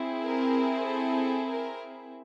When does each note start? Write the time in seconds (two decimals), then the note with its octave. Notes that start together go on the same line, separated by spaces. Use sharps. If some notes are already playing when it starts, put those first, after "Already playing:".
Already playing: C4 E4 G#4
0.23 A#4
0.85 A4
1.49 A#4